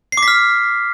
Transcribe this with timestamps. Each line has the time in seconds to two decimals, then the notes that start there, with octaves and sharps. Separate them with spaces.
0.12 C7
0.17 D6
0.23 B6
0.28 F6